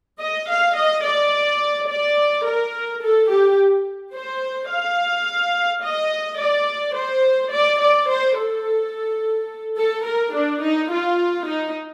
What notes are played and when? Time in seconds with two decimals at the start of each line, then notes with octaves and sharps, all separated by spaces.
0.20 D#5
0.49 F5
0.76 D#5
1.05 D5
1.89 D5
2.46 A#4
3.02 A4
3.30 G4
4.15 C5
4.71 F5
5.84 D#5
6.39 D5
6.95 C5
7.52 D5
7.81 D5
8.09 C5
8.37 A4
9.77 A4
10.06 A#4
10.33 D4
10.62 D#4
10.90 F4
11.46 D#4